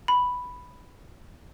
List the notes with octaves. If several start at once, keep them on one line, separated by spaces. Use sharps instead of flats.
B5